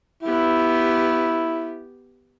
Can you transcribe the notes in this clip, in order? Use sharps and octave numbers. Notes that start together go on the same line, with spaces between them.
B3 E4 G4